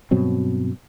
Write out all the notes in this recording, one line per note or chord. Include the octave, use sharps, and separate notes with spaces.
G2 B2 F#3 C4